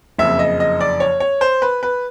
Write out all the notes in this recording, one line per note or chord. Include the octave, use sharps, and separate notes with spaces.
F#1 F2 C#3 E5
D#5
D#5
D5
C#5
C#5
C5
B4
B4